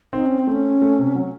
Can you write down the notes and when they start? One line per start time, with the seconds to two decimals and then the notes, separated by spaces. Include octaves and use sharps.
0.13 C4 D#4
0.26 C#4
0.39 C4
0.47 A3 C#4
0.82 A3
0.99 C3
1.15 F#3